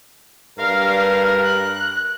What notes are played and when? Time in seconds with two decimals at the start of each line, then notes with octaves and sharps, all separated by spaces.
0.59 G2 A#4 F5
1.44 F#6